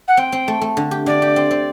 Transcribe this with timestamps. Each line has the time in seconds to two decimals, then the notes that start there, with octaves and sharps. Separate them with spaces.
0.07 F#5
0.17 C4 G5
0.32 C4
0.48 A3
0.61 A3
0.77 D3
0.91 G4
1.06 D3 D5
1.22 G4
1.36 C4
1.51 C4